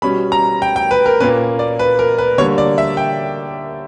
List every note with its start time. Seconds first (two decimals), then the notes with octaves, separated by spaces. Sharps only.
0.02 B2 G3 C#4 B5
0.32 A#5
0.62 G5
0.76 G5
0.91 B4
1.06 A#4
1.20 A#2 A#3 C#4 B4
1.59 D5
1.79 B4
1.99 A#4
2.18 B4
2.38 D3 G3 A#3 C#5
2.58 D5
2.78 E5
2.97 G5